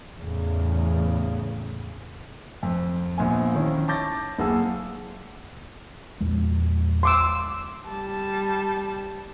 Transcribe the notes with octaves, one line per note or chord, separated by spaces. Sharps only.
E2 A2 C#3
F2
A#1 A#2 B3 F5 G#5
D#3 F3 C#4 E4
A5 C#6 D6 G6 A6 A#6
F#1 A#3 G#4 F#5 A5 E6
A#1 E2 G#3
C6 D6 E6
G3 A5